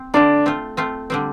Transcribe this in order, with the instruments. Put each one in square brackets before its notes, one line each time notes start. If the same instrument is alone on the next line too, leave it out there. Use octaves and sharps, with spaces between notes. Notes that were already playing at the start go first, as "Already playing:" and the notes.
Already playing: [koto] C4
[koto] D3 A3 F4 D5 [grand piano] D4
[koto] A3 C4 F4
A3 C4 F4
D3 G3 C4